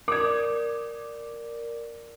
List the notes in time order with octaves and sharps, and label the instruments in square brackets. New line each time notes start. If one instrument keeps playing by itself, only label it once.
[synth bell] A#4 D5 [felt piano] D6 D#6 G#6